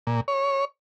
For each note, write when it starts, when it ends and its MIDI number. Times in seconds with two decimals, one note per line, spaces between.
0.07 0.21 46
0.28 0.65 73